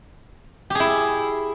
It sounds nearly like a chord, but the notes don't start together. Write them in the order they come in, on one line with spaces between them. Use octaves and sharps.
G4 G#4 E4